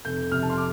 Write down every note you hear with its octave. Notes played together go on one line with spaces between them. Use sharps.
F1 G6
F2 C3 F6
A5
C6
D6